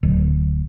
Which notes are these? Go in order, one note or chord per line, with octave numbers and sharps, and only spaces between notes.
D1